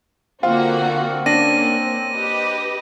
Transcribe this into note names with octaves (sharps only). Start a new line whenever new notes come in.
D3 A#3 C4 F4 F#4
A#3 C#4 D4 A#6 D#7
G4 B4 D#5